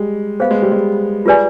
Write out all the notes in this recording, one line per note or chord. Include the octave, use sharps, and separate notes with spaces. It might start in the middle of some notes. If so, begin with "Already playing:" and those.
Already playing: G3 G#3
B3 G#4 C5 F5
G#3
G3
G#3
G3 F4 G#4 B4 D5 G#5